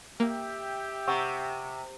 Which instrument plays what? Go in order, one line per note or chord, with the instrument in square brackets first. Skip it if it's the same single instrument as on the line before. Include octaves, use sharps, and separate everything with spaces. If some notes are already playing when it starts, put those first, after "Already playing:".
[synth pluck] A#3 [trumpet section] G4 E5 G5
[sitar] C3 [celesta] F#5 C#6 E6